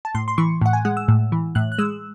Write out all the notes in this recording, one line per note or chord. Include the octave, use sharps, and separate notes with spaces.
A5
A2 C6
C6
E3 C#6
A2 F#5
G#5
G#3 F#5
E6
A2
E3
A2 F#6
F#6
G#3 E6